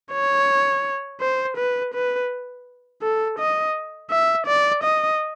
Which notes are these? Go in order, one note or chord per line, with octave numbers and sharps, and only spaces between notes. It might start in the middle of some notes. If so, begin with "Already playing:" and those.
C#5
C5
B4
B4
A4
D#5
E5
D5
D#5